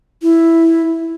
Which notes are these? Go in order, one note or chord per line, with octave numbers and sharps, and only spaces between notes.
E4